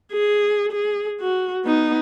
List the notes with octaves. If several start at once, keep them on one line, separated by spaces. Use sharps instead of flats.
G#4
G#4
F#4
B3 D#4